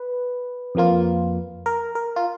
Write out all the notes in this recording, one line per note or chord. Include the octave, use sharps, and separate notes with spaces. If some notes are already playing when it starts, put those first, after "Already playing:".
Already playing: B4
F2 F3 A#3 F4
A#4
A#4
F4